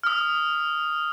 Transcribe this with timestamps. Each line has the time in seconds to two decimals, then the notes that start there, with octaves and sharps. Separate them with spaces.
0.03 D#6 F6